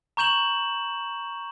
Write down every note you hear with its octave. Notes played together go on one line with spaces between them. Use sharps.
A#5 C#6 G6 E7 F#7